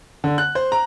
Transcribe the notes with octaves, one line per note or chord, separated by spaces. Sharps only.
D3
F#6
C5
A#5